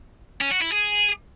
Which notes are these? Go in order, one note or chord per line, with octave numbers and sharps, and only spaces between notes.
C#4
F#4
E4
G#4